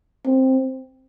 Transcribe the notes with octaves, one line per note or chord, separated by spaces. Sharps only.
C4